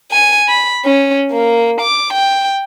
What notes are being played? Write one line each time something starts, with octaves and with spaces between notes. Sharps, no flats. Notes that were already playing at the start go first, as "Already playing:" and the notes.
G#5
B5
C#4
A#3
D6
G5